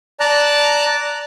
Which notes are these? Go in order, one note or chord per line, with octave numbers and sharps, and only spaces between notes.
D5 A5 A#5 F#6